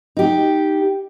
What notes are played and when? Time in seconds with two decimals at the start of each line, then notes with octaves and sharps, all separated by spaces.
0.17 D#4 G4